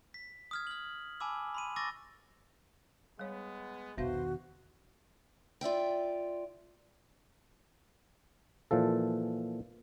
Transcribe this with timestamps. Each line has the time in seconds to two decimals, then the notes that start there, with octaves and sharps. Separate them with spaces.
0.14 B6
0.51 D#6 F6 G#6
0.67 F6 F#7
1.20 G#5 A5 B5 D6 E6
1.55 B5 C6 D#7
1.76 C#6 D6 E6 A6 A#6
3.19 G3 G#3 B3 C#5
3.97 B1 E2 D#3 B3 F#4 B4 C5 F5
5.61 F4 D5 E5 G5
8.71 A#2 E3 F3 A4